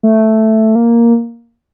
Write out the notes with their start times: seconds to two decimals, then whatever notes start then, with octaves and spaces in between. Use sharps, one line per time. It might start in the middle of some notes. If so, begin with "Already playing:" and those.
0.03 A3
0.75 A#3